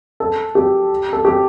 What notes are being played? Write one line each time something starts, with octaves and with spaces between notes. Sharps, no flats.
A4
G4
A4
G4